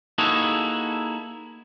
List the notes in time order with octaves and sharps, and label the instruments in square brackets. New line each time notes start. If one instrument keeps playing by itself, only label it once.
[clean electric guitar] A#3 D#4 E4 F#4 G#4 A4